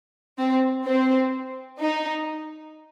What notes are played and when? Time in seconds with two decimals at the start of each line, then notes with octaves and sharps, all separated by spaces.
0.38 C4
0.86 C4
1.80 D#4